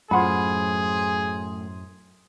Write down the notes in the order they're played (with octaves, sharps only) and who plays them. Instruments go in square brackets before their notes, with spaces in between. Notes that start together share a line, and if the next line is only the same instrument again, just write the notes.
[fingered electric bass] F#2 [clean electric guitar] A2 C5 [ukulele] F4 F#5 B5 [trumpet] G#4